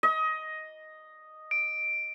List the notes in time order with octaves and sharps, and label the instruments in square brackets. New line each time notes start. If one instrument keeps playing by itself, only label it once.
[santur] D#5
[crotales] D7